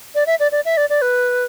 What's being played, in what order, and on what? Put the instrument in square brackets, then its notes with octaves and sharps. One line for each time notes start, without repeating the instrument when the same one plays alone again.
[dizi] D5
E5
D5
D5
E5
D5
D5
B4